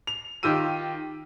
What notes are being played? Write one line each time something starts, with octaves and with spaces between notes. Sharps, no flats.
F7
D#3 F4 G4 E6 D#7